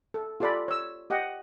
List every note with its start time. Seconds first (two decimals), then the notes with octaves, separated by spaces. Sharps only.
0.14 A4
0.40 F4 G4 A4 D5 G#5 B5
0.68 C#5 E6
1.10 G4 D#5 F#5 G5